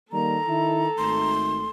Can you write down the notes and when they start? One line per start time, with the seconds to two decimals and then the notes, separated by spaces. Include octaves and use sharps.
0.12 D#3 G3 A#3 A4 A#5
0.48 D#3 E4
0.98 G#1 D#3 A3 C6